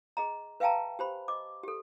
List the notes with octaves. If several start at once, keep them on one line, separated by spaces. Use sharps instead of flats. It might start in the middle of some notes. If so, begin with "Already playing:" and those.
G#4 D#5 A#5
B4 E5 F5 G5 A5 A#5
G4 C5 B5
D#5 D6
G4 A4